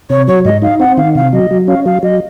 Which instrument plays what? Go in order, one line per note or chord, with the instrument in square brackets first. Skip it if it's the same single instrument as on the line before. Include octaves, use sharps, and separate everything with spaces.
[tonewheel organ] C3 [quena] C#5
[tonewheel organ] F#3 [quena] C#5
[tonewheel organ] G#2 [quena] D#5
[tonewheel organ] D#4 [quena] F5
[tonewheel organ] C4 [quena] F#5
[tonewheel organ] D#3 [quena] F5
[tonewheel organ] C3 [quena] F5
[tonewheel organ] F#3 [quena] D#5
[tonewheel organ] F#3
[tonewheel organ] C#4 [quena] F5
[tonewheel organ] F#3 [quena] F5
[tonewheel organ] F#3 [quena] D#5